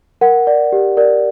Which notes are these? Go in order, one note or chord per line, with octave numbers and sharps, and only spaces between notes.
A#4 F#5
D5
G4
A#4 D5